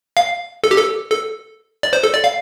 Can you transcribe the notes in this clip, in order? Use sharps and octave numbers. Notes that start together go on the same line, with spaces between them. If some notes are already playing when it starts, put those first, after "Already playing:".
F5
A4
G4
A4
A4
D5
C5
A4
D5
F5